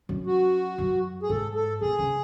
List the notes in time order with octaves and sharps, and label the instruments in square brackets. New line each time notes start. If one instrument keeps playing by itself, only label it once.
[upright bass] F#2
[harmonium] F#4
[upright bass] F#2
[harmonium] G#4
[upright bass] G#2 [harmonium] A4
[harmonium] A4
[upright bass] B2 [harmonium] G#4
[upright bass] C#3